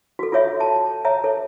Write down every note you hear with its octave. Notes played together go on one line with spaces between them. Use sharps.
F#4 A4
F4 A4 C#5 E5 B5
A5
C#5 E5 A#5
A4 C#5